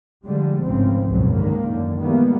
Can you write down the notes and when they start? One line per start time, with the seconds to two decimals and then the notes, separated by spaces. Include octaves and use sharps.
0.25 D3 F3 G3 G#3
0.63 G#1 C#2 A2 C#3 F3 C4
1.07 C#2 F#2 B2 D3 F#3
1.35 G#2 D3 D#3 A#3
1.69 F#2 D3
2.00 D#3 E3 G3 G#3 A#3 B3